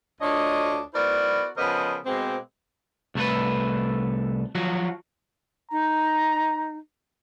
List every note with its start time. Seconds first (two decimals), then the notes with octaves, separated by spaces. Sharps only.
0.21 D2 D4 F4 C#5 D#5
0.94 B3 E4 F#4 A#4 C5 D5
1.57 C#3 F3 B3 A#4 C5 D#5
2.06 B2 G#3 A#3 C4
3.15 C2 A3 A4 B4
4.55 F3 F#3 F#4
5.71 D#4 A#5